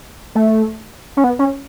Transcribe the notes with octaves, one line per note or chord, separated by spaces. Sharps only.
A3
C#4
B3
C#4